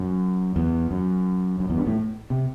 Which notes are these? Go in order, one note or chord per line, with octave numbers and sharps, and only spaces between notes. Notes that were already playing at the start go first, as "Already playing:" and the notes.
Already playing: F#2
E2
F#2
F#2
E2
G2
A2
C3